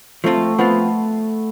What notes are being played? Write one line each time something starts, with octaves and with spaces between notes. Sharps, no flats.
F3 A3 C4 F4
F3 B3 C4 F4